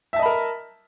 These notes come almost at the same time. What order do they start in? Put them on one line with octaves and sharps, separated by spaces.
E5 A5 D#5 B5 A#4